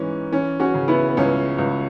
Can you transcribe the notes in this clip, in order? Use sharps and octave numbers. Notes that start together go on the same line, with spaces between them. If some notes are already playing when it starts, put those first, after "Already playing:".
Already playing: G#2 E3 C#4
E3 C#4
C#4 F#4
C#3
B3 E4
B3
C#2 C#4
C#2